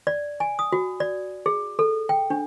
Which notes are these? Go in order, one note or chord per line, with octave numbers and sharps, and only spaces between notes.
D5
G#5
D#6
F#4
D5
G#4
A4
G5
D4